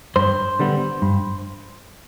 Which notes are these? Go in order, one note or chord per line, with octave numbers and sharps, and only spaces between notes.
G2 C5
D3 G3 B3
G2